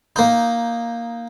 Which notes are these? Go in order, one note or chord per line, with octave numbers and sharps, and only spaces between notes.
A#3 D#4